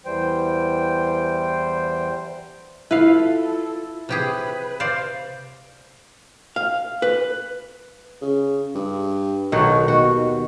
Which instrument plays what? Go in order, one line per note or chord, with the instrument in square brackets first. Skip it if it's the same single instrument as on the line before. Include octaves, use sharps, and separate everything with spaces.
[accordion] E2 E3 G3 C5 G5
[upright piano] E4 [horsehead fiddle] F4 A4 [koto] B4 F5
[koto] C3 G4 G#4 [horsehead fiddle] B4
[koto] C5 D5 F5
[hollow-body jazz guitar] F5
B4
[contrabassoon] C#3
G2
[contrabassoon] B1 [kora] B2 D#3 F#4
[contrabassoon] D#2 [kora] F#4